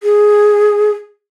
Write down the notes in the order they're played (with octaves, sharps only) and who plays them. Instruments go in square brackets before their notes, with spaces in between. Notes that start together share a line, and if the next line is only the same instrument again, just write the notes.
[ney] G#4